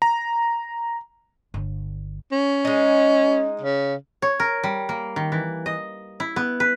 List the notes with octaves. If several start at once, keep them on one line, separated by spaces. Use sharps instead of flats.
A#5
G1
C#4
G#3 D#4
C#3
C#5
A#4
G3
A#3
D#3
E3
D#5
E4
B3
B4